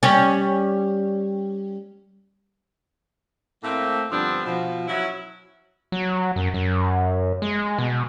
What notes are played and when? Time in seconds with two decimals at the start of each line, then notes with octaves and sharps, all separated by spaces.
0.03 G3 C#4
3.64 A2 A3 A#3 C4
4.12 G2 D3 F3 B3 C4 D4
4.46 B2 F3
4.88 F#3 C#4 E4
5.92 F#3
6.36 F#2
6.54 F#2
7.42 G#3
7.79 B2